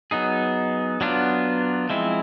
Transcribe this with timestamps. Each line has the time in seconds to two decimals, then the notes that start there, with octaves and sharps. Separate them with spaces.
0.11 F#3 B3 D#4 G#4
1.01 F#3 B3 D4 F4
1.89 F3 G#3 C4 E4